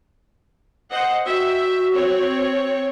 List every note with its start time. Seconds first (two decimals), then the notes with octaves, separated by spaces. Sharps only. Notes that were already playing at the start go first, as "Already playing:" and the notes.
0.91 C5 D#5 F#5
1.26 F#4 E5 G5
1.95 C4 C#5